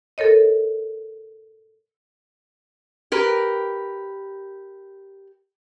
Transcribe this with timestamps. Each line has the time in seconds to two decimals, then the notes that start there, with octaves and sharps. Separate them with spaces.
0.18 A4 A#4 C#5 D#5
3.12 G4 A#4 B4